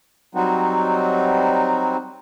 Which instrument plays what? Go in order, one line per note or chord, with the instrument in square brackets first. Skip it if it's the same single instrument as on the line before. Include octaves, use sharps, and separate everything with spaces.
[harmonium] F#3 G3 C4 D#4 F#4